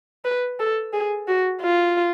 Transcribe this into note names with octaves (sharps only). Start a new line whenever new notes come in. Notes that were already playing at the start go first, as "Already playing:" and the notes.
B4
A4
G#4
F#4
F4